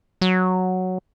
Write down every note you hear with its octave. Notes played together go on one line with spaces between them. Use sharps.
F#3